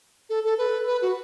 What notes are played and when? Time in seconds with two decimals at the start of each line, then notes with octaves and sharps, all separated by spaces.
0.30 A4
0.44 A4
0.58 B4
0.87 B4
1.02 F#4